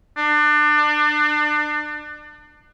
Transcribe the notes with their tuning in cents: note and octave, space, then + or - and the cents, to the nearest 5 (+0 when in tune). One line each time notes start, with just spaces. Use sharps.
D4 +30